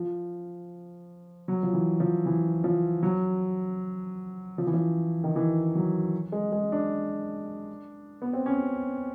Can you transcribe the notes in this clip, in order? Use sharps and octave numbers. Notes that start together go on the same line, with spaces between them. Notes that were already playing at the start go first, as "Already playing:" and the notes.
Already playing: F3
F#3
F3
E3
F3
E3
F3
F#3
F3
E3
F3
D#3
E3
F#3
G#3
G#3
D4
B3
C4
C#4